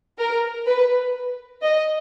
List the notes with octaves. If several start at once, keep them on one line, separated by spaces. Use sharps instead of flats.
A#4
B4
D#5